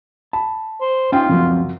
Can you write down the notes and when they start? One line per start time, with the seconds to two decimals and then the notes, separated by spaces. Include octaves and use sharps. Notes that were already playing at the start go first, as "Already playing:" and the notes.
0.33 A5 B5
0.81 C5
1.12 C#4 D#4 F4 F5 G5 C6
1.29 C#2 F#2 F3 F#3 C4